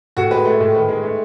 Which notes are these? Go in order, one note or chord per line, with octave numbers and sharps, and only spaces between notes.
A2 F#4
G#3 B4
A3
A2
D#3 B4
G#3
A3